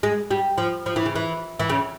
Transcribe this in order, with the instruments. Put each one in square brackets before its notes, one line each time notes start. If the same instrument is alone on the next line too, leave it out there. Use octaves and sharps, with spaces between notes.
[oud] G#3
G3
F3
F3
E3
C#3
E3
E3
C#3